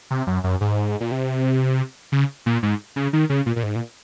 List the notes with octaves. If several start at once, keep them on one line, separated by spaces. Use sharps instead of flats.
C3
F#2
F#2
G#2
A#2
C3
C#3
A#2
G#2
C#3
D#3
C#3
A#2
A#2
G#2
A#2